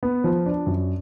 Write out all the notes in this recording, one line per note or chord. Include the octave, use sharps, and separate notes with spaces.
B3
F3
D4
F#2